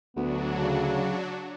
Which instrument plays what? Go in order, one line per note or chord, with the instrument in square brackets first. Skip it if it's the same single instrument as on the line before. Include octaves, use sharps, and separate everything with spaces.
[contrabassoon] D2 [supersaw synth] F#3 D4 F#4 [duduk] B3
[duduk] C#3